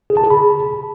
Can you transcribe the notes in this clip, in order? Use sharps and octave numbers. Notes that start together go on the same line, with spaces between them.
G#4
A5
G#4
B5